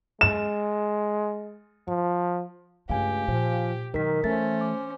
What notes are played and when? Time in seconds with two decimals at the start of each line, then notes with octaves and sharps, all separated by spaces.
0.21 G#3 E7
1.88 F3
2.90 C#2 G2 A3 G4 F5 G#5
3.28 A#2 F3
3.94 B2 D#3 F#3 A#4 B6
4.24 E3 A3 C#4 C5 A6
4.61 D6